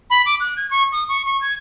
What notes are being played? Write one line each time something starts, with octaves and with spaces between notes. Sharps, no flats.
B5
D6
F#6
G#6
C#6
D#6
C#6
C#6
G#6